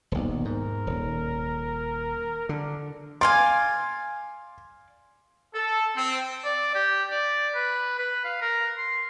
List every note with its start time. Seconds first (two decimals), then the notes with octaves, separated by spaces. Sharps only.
0.12 D#1 B1
0.45 G#2 A#4
0.87 D#1
2.49 D3 D4
3.21 D5 F5 G#5 C6
5.55 A4
5.97 C4
6.44 D5
6.75 G4
7.11 D5
7.54 B4
7.98 B4
8.24 F5
8.41 A#4
8.77 C6